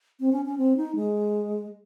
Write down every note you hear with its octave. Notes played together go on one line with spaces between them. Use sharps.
C4
C#4
C#4
C4
D#4
G#3